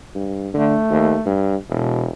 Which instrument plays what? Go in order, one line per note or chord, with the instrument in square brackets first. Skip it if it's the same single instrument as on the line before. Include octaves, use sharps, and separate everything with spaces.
[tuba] G2
[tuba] D3 [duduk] A3
[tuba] D#2
G2
[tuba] E1 [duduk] B2